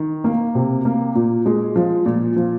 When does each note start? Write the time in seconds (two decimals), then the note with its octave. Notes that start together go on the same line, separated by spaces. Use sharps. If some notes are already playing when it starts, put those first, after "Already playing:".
Already playing: D#3
0.24 A#3
0.55 C3
0.85 A#3
1.15 A#2
1.46 G#3
1.76 F3
2.06 A#2
2.36 F3